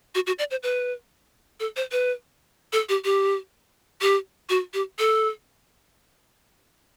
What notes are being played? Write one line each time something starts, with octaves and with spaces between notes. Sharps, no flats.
F#4
F#4
D5
C5
B4
A4
C5
B4
A4
G4
G4
G4
F#4
G4
A4